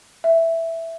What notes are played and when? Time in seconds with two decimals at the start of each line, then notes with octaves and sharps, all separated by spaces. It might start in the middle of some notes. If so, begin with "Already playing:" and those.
0.24 E5